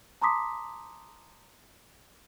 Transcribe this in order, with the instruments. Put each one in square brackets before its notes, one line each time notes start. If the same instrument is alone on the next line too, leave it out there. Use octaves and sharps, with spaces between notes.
[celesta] A5 A#5 C6 D6 D#6 B6